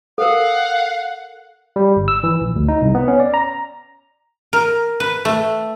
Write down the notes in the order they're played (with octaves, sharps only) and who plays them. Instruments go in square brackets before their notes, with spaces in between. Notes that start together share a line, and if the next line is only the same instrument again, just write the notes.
[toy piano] A4 A#4 [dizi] F5 [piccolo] F#5
[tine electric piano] G3
G1
E6
E3
A#1
D2
D#4
C2
B3
C#4
D5
A#5
[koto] A#4
B4
A3